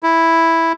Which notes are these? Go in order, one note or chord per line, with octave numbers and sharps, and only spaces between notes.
E4